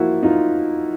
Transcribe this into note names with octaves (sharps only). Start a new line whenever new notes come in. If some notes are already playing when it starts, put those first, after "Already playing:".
Already playing: F3 A#3 E4 F#4
D#4 F4